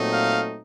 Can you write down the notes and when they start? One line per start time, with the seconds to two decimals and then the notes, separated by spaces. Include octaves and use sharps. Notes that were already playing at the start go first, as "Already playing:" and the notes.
Already playing: A#2 F#3 A3 C4 D#4
0.13 F5